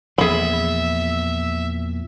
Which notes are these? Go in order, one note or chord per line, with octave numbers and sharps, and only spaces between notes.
E2 A#2 F3 G#4 E5 B5